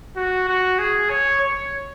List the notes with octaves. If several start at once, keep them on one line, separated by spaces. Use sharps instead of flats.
F#4
F#4
G#4
C#5
C#5